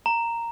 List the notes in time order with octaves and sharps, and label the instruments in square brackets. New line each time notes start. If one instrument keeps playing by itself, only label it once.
[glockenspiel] A#5